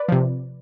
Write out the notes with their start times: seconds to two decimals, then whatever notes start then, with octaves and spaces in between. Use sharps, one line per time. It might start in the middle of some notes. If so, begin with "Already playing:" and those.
Already playing: B4 D5
0.09 C3 F3